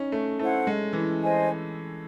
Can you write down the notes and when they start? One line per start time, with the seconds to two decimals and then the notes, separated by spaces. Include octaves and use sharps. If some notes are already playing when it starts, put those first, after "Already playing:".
Already playing: C#4 D#4
0.12 A3
0.39 A3 E4 C5 F#5
0.67 G#3
0.93 E3
1.21 C5 D#5 G#5